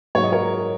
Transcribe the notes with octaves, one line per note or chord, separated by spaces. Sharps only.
G#2 F#3 C#5
D#5
A#4 C#5